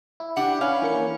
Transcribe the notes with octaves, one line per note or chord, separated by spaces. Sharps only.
E4
D4 G4 F#5
C#4 B4 F5
E3 A#3 C#7